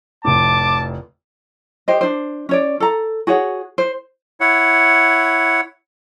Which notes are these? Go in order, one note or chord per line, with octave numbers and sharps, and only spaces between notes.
F1 A2 A5 D6
G4 C5 D#5
D4 C5
C#4 C#5 D5
A4 A#5
F#4 G#4 C#5 F#5
C5
E4 C#5 F#5